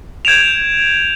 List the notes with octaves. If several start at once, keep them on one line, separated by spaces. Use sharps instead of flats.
G6 G#6 D7 E7 F7